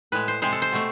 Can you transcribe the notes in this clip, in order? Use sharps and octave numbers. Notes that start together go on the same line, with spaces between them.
A2 G#3 B4
C5
C3 G#3 C5
A4
C5
B2 A3